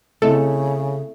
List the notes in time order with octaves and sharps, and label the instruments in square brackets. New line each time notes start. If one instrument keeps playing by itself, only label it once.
[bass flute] C#3 [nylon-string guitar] A3 [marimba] C4 E4 D#5 [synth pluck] A4